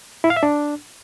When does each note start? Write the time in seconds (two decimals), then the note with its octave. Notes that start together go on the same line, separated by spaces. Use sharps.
0.24 E4
0.30 F5
0.36 E5
0.43 D4